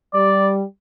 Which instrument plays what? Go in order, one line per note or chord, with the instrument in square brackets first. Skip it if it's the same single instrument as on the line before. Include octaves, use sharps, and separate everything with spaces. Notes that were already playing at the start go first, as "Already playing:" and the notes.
[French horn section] G3 [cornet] D5